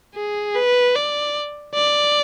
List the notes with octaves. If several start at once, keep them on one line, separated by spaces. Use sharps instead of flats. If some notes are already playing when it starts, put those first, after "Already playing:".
G#4
B4
D5
D5